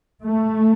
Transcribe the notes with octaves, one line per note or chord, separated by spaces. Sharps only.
A3